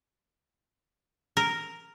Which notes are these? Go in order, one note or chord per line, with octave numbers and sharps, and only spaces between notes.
A#4